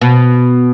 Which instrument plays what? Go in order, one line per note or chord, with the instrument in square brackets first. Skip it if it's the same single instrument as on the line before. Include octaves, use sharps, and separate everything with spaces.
[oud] B2